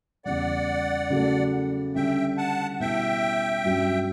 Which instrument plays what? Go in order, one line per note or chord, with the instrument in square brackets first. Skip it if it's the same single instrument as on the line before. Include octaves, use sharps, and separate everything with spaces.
[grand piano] E2 C#3 G3 [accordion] D5 F#5
[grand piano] C#3 F#3 A3
[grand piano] D3 G3 C#4 [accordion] E5 G5
[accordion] F#5 A5
[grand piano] B2 G3 B3 E4 [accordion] E5 G5
[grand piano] G2 F#3 C#4